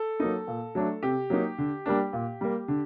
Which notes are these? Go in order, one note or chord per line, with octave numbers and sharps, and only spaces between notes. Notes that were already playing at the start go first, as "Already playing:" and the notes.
Already playing: A4
F#3 A#3 D#4
A#2
F#3 A3 D4
C3 G4
F#3 A#3 D#4
D3
G3 A#3 D4
A#2
G3 A#3
D3